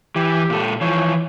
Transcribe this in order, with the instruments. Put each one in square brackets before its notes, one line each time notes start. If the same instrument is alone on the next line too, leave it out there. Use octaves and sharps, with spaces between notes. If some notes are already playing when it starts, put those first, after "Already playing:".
[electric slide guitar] E3 [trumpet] G4
[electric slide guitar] A#2 A4
[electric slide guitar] E3 F3 [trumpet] C#5